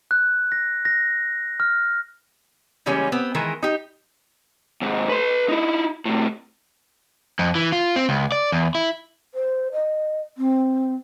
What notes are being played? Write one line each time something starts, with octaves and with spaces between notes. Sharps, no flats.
F#6
A#6
A#6
F6
C#3 E3 G3 G#3 A#3 C#4
B3 C4
D#3 E3 G#3 A#4
D#4 G4
D#2 G#2
B4 C6
D#4 E4
A2 C3
F2
E3
F4
C4
C#2
D5
E2
E4
C5
D#5
C4